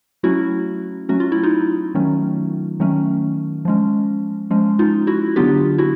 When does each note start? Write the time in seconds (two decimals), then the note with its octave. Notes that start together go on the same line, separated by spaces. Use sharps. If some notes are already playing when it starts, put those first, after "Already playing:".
0.23 F#3 A3 C#4 E4 F#4
1.09 F#3 A3 C#4 F#4
1.20 F4
1.32 E4
1.43 D#4 F4
1.95 D#3 F#3 A3 C#4
2.80 D#3 F#3 A3 C#4
3.65 F3 G#3 C#4
4.51 F3 G#3 C#4
4.79 D#4 F4
5.07 E4 F#4
5.36 D3 F#3 B3 D4 F4 G4
5.78 E4 F#4